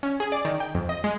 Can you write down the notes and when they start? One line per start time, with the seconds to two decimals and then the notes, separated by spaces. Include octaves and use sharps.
0.03 C#4
0.20 G#4
0.32 D5
0.45 D#3
0.60 G5
0.75 F2
0.89 D#5
1.04 G#3